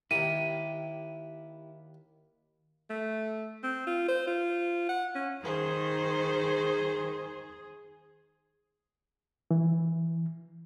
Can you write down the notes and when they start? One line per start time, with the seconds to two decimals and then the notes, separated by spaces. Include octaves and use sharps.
0.11 D#2 E4 G4 A#4 D#7
2.90 A3
3.63 C4
3.87 F4
4.08 C5
4.27 F4
4.89 F#5
5.15 C#4
5.44 D#3 G#4 C5
9.51 E3